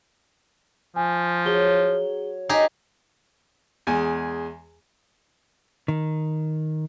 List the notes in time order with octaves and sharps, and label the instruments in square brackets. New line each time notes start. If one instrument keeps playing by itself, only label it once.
[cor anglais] F3 [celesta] G#5
[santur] F#3 C#5 D#6 [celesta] G#4 G7
[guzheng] D#4 G4 G#4
[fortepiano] E2 G#3 G#5
[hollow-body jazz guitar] D#3